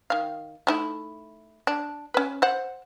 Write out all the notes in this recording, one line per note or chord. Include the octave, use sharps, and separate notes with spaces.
D#3 F5
A3 D#4 E4
D4
C#4 B4
C5 F#5